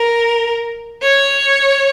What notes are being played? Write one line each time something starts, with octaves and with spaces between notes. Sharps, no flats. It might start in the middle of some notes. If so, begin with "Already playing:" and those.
Already playing: A#4
C#5